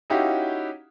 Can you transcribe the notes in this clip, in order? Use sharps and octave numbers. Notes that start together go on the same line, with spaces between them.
C#4 D#4 E4 F#4 G4 F5